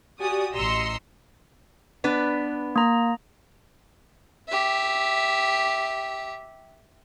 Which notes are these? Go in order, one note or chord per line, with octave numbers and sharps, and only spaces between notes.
F#4 G4 D5 G#5 D#6
A1 D#5 A#5 C6 E6 C#7
B3 D4 B4
A#3 A#5
G4 E5